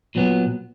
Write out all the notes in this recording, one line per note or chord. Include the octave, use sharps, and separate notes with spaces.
A#2 F#3 B3